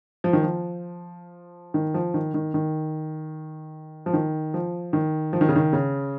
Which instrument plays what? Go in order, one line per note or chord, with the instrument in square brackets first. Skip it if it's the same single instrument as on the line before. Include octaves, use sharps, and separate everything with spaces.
[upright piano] F3
D#3
F3
D#3
F3
D#3
D#3
D#3
F3
D#3
F3
D#3
F3
D#3
C#3
D#3
C#3